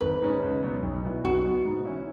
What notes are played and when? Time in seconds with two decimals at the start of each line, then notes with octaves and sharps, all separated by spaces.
0.01 G#1 B4
0.22 G#2 G#3 C#4
0.42 C#2
0.63 B2 F#3 B3
0.82 B1
1.04 B2 B3 E4
1.24 B1 F#4
1.45 B2 B3
1.65 G#2
1.85 E3 C#4 E4